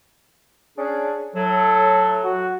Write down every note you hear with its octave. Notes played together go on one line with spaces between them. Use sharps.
C#4 D4 G#4
A2 F#3 A4
F#4